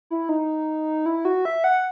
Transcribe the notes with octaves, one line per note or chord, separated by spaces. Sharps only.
E4
D#4
E4
F#4
E5
F#5